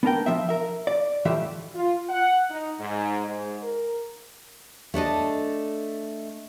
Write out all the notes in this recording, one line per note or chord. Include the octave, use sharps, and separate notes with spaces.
B3 D4 A#4 G5
F3 F4 E5
A#4 E5
D5
A2 E3 G3 A3 F4 E5
F4
F#5
D#4
G#2
G#2
A#4
A3 D4 A4 D#5